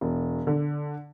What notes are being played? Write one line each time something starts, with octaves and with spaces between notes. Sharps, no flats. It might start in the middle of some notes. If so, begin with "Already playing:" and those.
E1
D3